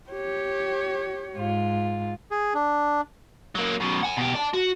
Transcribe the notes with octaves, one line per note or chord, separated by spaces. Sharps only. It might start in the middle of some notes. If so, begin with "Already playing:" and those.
G4 C#5
G#2 F4
G#4
D4
F#3 A#3
F#2 B2
F#5 G#5
B2 G4
D5 A5
F#4